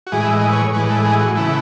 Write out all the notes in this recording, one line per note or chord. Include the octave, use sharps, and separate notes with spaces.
F#4
A2 E3 G#3 G#4
E5
D#5
B4
C#5
A2 E3 G#3 B4
A4
G#4
F#4
C#3 E3 A3 E4